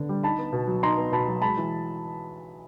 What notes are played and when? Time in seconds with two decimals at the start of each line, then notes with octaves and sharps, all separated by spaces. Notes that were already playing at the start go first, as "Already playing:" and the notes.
Already playing: D3 B3 D4
0.09 G3
0.23 D#4 A5 B5
0.38 B3
0.53 B2
0.67 F#3
0.83 D#4 A#5 C6
0.97 B3
1.12 B2 A5 B5
1.28 F#3
1.42 G#3 A5 B5
1.57 E3